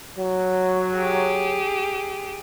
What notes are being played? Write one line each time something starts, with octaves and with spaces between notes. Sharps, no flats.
F#3
G4 G#4